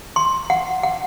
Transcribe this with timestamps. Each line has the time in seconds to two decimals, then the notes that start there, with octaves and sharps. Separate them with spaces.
0.16 C6
0.50 F#5
0.83 F#5